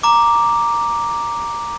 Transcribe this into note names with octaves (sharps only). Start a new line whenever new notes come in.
A#5 D6